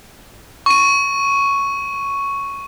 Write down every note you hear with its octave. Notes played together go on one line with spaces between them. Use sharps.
C#6 D#7